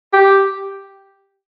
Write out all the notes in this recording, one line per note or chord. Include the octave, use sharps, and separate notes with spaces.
G4